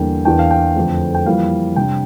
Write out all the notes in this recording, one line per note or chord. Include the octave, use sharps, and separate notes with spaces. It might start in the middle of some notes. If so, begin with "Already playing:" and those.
Already playing: E2 D3 G3 A#3 D4 G5
E2 E3 A#3 D4 G5
F5
G5
F2 D3 A3 C4
G5
F2 E3 G3 A#3 F5
C3 G3 D4 G5